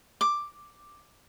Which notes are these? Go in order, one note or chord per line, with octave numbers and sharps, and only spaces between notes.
D6